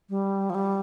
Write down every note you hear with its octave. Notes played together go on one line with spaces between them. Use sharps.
G3
F3
G3